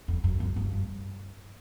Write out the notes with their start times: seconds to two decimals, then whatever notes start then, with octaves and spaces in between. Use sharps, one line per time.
0.08 F2
0.24 F#2
0.40 F#2
0.56 G2